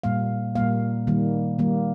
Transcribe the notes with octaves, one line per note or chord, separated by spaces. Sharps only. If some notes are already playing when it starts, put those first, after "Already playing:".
A#2 G3 A#3 F5
A#2 G3 A#3 F5
D#3 G3 A#3
D#3 G3 A#3